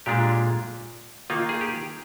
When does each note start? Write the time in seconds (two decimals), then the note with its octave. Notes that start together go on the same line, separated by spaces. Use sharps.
0.06 A#2 G#3 D4 F4 G4
1.30 D#3 A#3 D#4 F4
1.49 G#4
1.61 G4